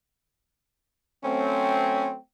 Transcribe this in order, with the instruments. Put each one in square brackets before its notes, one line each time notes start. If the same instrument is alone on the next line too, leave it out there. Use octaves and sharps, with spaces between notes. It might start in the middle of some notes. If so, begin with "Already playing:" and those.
[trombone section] F#3 A3 C4 [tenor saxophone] C#4